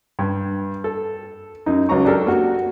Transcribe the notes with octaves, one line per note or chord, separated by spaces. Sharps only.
G2
A4
F#2 D#4
C#2 F#3 C#5 A#5 C#6
D4 G4 A4 A#4
A#3 F#4